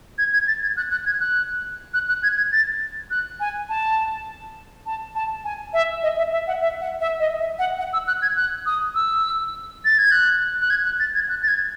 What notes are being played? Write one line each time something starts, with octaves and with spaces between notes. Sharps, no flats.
G#6
G#6
A6
G#6
F#6
F#6
G#6
F#6
F#6
F#6
G#6
G#6
A6
F#6
G#5
A5
A5
A5
G#5
E5
D#5
E5
E5
F#5
E5
F#5
E5
D#5
E5
F#5
F#5
E6
F#6
G#6
F#6
D#6
E6
A6
G#6
F#6
F#6
G#6
F#6
A6
G#6
F#6
A6
G#6